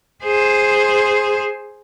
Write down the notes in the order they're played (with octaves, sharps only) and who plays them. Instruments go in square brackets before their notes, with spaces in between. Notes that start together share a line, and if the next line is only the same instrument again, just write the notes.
[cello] G#4 C5